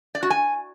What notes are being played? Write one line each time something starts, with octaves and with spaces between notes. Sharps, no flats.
D5
F#4
G#5